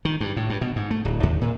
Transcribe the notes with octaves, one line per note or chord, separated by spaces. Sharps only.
D#3
G2
A2
G2
B2
G#2
A3
D1
D#2
A#2